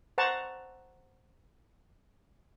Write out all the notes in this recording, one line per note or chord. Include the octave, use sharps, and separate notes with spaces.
C5 F#5 A5 A#5 C#6